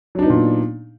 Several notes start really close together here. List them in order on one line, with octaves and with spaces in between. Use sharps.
F#3 D4 D#4 B3 A#2